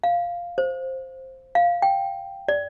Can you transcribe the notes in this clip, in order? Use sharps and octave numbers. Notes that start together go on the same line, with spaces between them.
F5
C5
F5
G5
D5